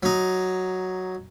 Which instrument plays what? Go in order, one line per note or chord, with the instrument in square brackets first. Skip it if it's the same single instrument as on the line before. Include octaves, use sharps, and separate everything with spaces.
[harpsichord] F#3 D#4